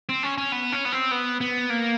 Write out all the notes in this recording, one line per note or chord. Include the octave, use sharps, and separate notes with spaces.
C4
C#4
C#4
B3
C#4
B3
C4
B3
B3
A#3